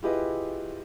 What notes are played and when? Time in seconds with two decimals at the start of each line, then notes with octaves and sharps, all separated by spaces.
0.03 E4 F4 G4 G#4 B4 D#5